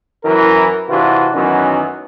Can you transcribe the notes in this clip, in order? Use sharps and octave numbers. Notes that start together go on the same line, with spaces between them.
F#2 E3 E4 A#4
C3 E3 D4 F4 F#4
F#2 D#3 E3 F#3 B3 C#4